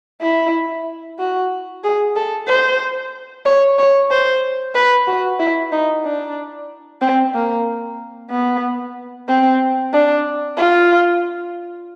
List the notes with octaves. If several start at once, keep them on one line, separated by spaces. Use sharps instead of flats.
E4
F#4
G#4
A4
C5
C#5
C#5
C5
B4
F#4
E4
D#4
D4
C4
A#3
B3
C4
D4
F4